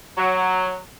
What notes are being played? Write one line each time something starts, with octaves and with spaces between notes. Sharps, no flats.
F#3